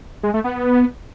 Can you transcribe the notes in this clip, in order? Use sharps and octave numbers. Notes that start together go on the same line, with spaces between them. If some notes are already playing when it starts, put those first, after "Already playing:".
G#3
A3
B3